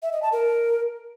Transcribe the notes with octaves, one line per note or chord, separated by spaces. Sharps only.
E5
D#5
A5
A#4